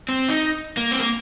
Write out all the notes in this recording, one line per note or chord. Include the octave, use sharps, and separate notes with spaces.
C4
D#4
A#3
C4
A#3